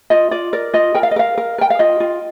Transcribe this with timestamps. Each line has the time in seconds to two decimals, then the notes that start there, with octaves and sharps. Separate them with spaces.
0.10 F4 D#5
0.31 F4 D5
0.53 A#4 D5
0.74 F4 D#5
0.95 A#4 G5
1.03 F5
1.11 D#5
1.16 A#4 F5
1.38 A#4
1.58 A#4 G5
1.70 F5
1.79 F4 D#5
2.00 F4